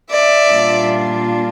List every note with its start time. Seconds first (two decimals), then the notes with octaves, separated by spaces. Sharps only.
0.12 D5 E5
0.51 A#2 G3 A#3 D4 F4